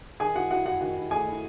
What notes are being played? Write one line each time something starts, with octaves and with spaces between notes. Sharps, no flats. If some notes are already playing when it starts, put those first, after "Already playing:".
D#3 G#4 G#5
E4 F#4 F#5
E4 F#4 F#5
E4 F#4 F#5
D#3 F#4 F#5
E4
A3 G#4 G#5
E4